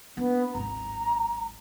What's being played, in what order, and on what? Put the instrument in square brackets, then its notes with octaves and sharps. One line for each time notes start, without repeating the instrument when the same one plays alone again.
[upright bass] A#3 D4 [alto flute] B3
[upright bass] D1 G#1 [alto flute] A#5